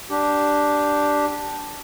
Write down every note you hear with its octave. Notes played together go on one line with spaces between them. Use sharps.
D4 G4